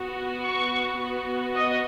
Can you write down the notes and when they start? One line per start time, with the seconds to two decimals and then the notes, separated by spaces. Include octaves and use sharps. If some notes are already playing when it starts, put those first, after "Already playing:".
Already playing: B3 F#4
0.44 C#6
1.00 B3 F#4
1.56 D#5